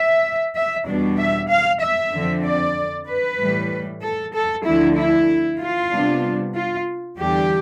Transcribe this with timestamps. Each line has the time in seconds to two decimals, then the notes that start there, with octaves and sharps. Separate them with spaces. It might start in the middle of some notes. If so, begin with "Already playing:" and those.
Already playing: E5
0.55 E5
0.87 E2 B2 G3 B3 D4
1.18 E5
1.50 F5
1.81 E5
2.13 F2 D3 F3 C4
2.44 D5
3.08 B4
3.39 A2 E3 G3
4.03 A4
4.34 A4
4.65 D2 D3 F3 A3 D4 E4
4.97 E4
5.60 F4
5.92 C3 G3 B3 D4
6.55 F4
7.18 E2 D3 G3 D4 G4